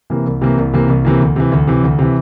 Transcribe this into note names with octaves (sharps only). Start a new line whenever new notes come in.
C3 E3 A#3
C2
C3 E3 A#3
C2
C3 E3 A#3
C2
C3 E3 A#3
D2
C3 E3
D2
C3 E3
D2
C3 E3